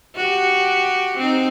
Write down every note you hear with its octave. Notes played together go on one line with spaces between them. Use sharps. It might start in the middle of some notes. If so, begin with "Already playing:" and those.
F#4 G4
C4 D#4